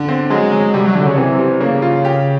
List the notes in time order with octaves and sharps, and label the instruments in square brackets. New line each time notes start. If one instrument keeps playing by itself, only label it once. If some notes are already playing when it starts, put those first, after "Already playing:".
Already playing: [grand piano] D3
C4
[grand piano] F#3 [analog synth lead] G#3
[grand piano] F#3
[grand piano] C3 [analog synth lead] G3
[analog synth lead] F#3
[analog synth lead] D3 [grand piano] F#3
[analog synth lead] C#3
[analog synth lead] C3 [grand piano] E3
[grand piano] G3
[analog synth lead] C#3 [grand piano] A#3
[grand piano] F4
G4